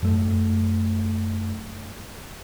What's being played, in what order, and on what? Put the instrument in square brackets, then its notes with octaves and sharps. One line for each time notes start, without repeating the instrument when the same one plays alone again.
[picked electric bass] F#2 A3